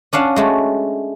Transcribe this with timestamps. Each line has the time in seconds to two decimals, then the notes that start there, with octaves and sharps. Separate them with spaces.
0.13 C#4 D4 F5 F#5
0.36 G#3 A3 F#4